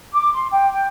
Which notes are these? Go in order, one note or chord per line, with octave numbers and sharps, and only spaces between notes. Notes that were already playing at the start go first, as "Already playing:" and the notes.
D6
C6
G5
G5